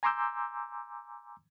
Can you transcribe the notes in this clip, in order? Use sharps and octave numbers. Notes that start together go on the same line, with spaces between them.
G#5 A#5 C6 D6 E6 G6